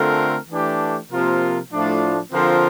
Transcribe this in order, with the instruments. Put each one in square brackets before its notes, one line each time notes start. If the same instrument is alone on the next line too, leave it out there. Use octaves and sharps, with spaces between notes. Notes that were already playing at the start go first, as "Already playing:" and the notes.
Already playing: [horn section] D3 A3 C4 F4 A#4
E3 A3 D4 G4
C3 F3 A#3 F4 A#4
A2 F3 A3 D4 F4
D3 F3 C4 F4 A#4